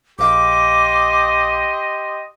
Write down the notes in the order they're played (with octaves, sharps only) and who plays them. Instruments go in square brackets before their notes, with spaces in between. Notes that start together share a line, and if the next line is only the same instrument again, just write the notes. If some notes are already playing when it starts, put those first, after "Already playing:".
[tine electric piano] A#1 F5 [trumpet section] G4 D#5 C6 [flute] D6